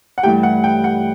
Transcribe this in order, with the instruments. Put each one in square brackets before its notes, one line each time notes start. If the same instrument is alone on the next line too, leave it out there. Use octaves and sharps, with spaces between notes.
[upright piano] F#5
[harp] G2 E3 A3 E4 G4 [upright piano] G5
[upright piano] F#5
G5
F#5